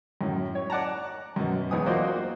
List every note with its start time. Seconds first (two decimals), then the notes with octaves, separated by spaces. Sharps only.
0.21 F#2 A2
0.55 C#5
0.70 D5 F#5 A5 A#5
1.36 F#2 B2
1.71 B1 E2 B3 G#5 D#6
1.86 A#3 F4 F#4 C5 D5 D#5